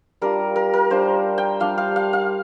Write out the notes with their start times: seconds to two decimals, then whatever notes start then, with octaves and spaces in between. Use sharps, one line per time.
0.21 G3 D4 F4 A#4
0.56 A#4
0.74 A#4
0.90 G3 D4 F4 C5
1.38 G5
1.60 G3 D4 F4 F5
1.78 F5
1.96 F5
2.13 F5